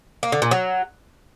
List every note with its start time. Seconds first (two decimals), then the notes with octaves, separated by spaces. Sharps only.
0.23 A#3
0.32 D3
0.42 A#2
0.51 F#3